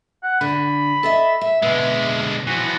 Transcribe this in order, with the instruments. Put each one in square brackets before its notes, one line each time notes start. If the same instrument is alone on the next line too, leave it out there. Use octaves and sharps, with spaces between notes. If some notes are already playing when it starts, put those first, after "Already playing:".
[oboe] F#5
[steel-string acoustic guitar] D3 [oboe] B5
[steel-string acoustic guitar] A4 D#5 E5
E5
[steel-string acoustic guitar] B2 [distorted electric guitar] D3 G#3 [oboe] E5
[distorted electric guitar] E3 F3 [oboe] F#4